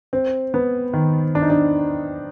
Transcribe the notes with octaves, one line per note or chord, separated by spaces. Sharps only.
C4
B3
D#3
D4
D#4
D4